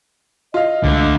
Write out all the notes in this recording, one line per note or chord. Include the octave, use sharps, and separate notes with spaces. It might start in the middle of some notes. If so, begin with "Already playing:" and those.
F4 D#5 F5
C#2 D3 A3